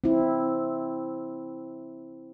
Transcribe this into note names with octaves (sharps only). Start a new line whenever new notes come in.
C4 E4